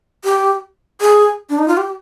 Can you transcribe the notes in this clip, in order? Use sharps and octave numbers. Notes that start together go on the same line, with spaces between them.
G4
G#4
D4
D#4
F4
G4